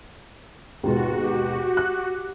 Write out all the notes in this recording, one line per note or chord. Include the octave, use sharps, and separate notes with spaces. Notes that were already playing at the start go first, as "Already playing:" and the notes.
D#2 G#2 B2 F4 F#4
G4
F#6